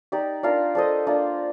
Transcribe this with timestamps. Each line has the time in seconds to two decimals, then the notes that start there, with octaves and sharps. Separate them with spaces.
0.12 D#4 G4 D5
0.43 D4 F4 A#4 F5
0.75 D4 A4 C5 D#5
1.07 A#3 D4 F4